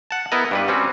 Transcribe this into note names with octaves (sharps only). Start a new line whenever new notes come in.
F#5 A5
B3 E4 A#4 D#5
G2 G3 B4
G3 C4 C#4 F#4